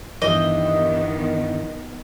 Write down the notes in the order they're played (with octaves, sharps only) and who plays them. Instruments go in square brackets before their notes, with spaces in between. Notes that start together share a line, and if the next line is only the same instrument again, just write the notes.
[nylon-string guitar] G2 E3 G3 [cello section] D#3 B3 [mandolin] D#5